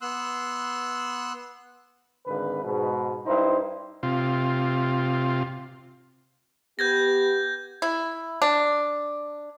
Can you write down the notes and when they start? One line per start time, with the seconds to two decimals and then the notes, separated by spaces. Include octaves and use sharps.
0.01 B3 C6 E6 F#6
2.26 G#1 D3 B4
2.64 G#2 B2
3.26 G2 D#4 E4 C5
4.03 C3 F4
6.79 B3 G4 B4 G6 G#6 A#6
7.82 E4
8.42 D4